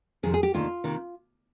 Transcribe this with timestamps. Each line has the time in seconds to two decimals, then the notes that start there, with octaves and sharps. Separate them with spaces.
0.23 F2 C3 D#3 G#4
0.34 G#4
0.43 G4
0.54 D2 C3 D#3 A#3 F4
0.84 C3 D#3 A#3